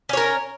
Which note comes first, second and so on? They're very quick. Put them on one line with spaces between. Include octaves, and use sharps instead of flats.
C#4 C#5 A#4